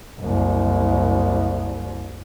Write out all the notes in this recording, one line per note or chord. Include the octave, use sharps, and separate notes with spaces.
F#1 C2